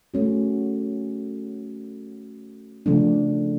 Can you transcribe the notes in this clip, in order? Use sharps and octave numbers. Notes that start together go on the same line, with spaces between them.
A3 C#4 F#4
C#3 F3 A3 D4